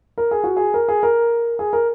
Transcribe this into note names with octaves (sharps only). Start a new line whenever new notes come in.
A#4
G#4
F#4
G#4
A#4
G#4
A#4
G#4
A#4